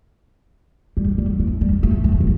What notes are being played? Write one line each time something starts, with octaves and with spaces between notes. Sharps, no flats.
G3
G3
E3
G3
A3
A3
E3